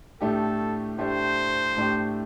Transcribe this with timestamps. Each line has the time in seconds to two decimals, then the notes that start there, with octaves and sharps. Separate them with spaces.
0.21 A2 A3 D4 G4 A4
0.98 A2 A3 D4 G4 C5
1.77 A2 A3 D4 G4